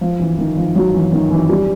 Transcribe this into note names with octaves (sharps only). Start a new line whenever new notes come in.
F3
E3
D#3
F3
F#3
E3
D#3
E3
G3